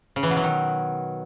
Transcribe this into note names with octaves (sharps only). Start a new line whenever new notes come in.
C#3
E3
B2
F#3
D#3